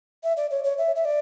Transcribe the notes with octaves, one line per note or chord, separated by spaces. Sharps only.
E5
D5
C#5
C#5
E5
E5
D5